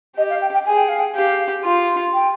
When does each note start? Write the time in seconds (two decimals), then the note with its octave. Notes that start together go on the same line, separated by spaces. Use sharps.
0.17 G4 D#5
0.29 F5
0.41 G5
0.53 G5
0.66 G#4 G#5
0.77 G5
0.88 F5
0.99 G5
1.15 G4 F5
1.64 F4
2.13 G5